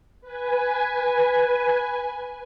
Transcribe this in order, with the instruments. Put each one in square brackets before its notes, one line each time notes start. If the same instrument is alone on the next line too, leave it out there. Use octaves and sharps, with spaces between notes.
[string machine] B4 G#5